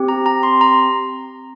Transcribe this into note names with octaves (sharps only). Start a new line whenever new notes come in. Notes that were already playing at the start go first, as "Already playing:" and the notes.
Already playing: C4 G4
A#5
A#5
C6
A#5